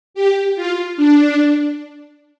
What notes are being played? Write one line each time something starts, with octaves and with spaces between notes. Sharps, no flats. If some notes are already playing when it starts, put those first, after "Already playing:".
G4
F4
D4